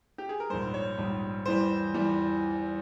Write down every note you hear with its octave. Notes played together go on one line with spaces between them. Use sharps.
G4
G#4
A#4
A#1 G#2 G3 C5
C#5
A#1 G#2 G3
E2 E3 G3 C5
E2 E3 G3